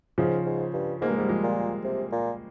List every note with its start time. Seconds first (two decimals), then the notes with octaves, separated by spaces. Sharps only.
0.18 G#2 C#3 F3
0.46 G#2
0.74 G2
1.01 G#2 A#3
1.09 G2 G#3
1.16 G#2 G3
1.29 F3 G#3
1.43 A#2
1.84 C3
2.12 A#2